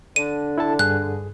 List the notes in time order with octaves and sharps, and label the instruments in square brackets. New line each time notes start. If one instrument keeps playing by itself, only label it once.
[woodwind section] D3 D4 [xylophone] D#7
[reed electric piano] E4 A4 A5
[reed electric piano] G2 G#4 [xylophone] F#6